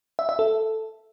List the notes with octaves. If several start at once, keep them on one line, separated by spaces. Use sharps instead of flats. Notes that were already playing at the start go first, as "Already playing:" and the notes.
E5
E5
A4